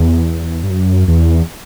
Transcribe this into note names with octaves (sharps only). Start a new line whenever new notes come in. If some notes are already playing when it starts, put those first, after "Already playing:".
Already playing: E2
G2
F#2
E2